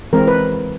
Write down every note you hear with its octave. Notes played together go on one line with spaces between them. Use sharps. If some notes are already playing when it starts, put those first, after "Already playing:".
E3 G#3 C4 A#4
B4